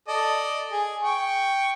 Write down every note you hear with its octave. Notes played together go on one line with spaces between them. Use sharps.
A4 D5 D#5
G#4
G5 C#6